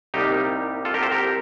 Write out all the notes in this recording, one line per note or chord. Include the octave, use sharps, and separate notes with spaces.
C2 C3 G3 A#3 D#4 G4
F4 A4
G4 A#4
A4 C5
G4 A#4